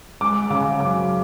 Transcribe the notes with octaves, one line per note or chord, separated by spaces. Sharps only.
G#3 D6
C#3 D6
F#2 D6